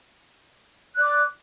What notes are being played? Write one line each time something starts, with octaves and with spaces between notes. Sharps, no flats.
D5 D6 F#6